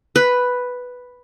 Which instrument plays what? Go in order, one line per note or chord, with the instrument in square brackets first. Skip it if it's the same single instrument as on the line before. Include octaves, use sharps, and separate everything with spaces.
[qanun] B4